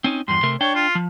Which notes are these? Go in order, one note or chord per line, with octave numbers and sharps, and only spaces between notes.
C4 C#4 D#4
E2 G2 C6
C3 A3 A#4
D4 C#5 D5 G5
F4
F3